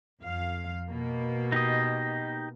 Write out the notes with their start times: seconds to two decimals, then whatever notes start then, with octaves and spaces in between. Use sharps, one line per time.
0.20 F2 F5
0.89 B2 A#3
1.52 D#4 G4 D#5